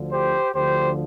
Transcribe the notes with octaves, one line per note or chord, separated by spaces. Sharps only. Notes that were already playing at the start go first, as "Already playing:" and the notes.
Already playing: D2 D3 F3
G4 C5
D2 D3 F3 G4 C5